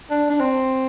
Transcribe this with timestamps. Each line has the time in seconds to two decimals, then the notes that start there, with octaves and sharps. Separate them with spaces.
0.10 D4
0.30 D4
0.40 C4